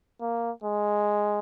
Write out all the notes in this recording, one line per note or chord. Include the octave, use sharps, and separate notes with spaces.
A#3
G#3